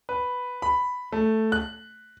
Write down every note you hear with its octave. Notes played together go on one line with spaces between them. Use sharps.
B4
B5
A3
F#6